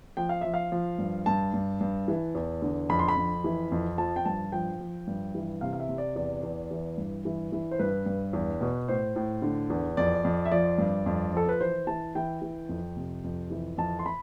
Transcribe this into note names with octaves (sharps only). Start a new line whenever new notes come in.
F3 G5
F5
F3 E5
F5
F3
G2
G2 A5
G2
G2
E3
E2
D3
F2 B5
C6
B5
F2
E3
F2
F3 A5
G5
G2 A5
F3 G5
F3
G2
E3
C3 F5
F5
E5
C3
D5
E2 D5
E2
E3
G2
E3
E3
C5
G2 B4
G2
E2
B2
A2 C5
A2
D3
E2
F2 D5
F2
E5
F3 D5
G2
F2
F3 A4
B4
E3 C5
E3 A5
E3 G5
E3
F2
C3
F2
E3
F2 A5
C6
B5